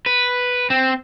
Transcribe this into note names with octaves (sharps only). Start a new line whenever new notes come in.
B4
C4